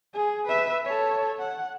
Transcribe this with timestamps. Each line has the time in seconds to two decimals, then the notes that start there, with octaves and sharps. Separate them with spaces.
0.14 G#4
0.47 B4 E5
0.85 A4 C#5
1.39 F#5